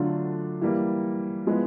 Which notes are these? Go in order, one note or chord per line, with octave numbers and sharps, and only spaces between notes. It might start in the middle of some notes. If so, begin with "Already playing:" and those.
Already playing: D3 F#3 A3 D4 F4
E3 G3 A#3
F3 G#3 B3 E4 G#4